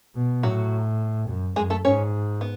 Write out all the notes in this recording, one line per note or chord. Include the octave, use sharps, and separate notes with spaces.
B2
A2 F#3 F#4
F#2
F#2 G#3 G#4
A3 A4
G#2 C#4 C#5
B3